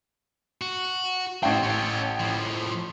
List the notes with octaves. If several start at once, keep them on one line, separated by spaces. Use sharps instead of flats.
F#4
A1 C4 C#4 G5
C#4 A4
A2 F3